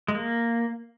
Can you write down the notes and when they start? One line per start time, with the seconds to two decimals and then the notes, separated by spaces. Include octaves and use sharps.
0.08 G#3
0.15 A#3